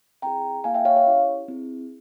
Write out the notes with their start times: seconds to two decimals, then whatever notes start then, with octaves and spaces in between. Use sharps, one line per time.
0.22 C4 E4 G#4 G5 A#5
0.64 A#3 E4 G#4 F5 G#5
0.74 E5 G5
0.85 C#5 F5
0.96 C#5
1.06 C#4 E4 G4
1.48 C4 E4 G#4